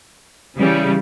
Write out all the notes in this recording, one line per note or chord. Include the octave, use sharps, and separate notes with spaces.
C#3 E3 G3